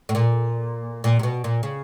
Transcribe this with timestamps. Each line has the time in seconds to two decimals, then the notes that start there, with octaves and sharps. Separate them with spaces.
0.09 A2
0.15 A#2
1.04 A#2
1.19 C3
1.23 B2
1.44 A#2
1.63 C#3